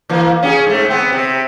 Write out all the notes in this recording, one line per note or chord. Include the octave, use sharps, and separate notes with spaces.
E3 A#3
C#4 G4 G#4
G#2 A3
B3 C4
C3